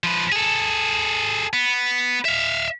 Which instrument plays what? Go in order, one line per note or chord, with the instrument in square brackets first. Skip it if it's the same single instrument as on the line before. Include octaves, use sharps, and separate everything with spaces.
[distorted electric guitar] F3 B4
G#4 A4
B3
E5 F5